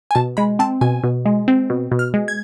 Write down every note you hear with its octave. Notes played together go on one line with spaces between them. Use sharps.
G#5
B2 A5
G#3 B5
C4 A5
B2 G#5
B2
G#3
C4
B2
B2
F6
G#3
G#6